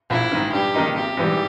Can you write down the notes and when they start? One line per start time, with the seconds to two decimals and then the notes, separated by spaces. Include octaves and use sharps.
0.10 A#1 E4
0.32 G#2 D#3
0.53 G2 G4
0.74 D#3 A#3 D#4
0.95 G#1 G4
1.17 G#2 E3 G3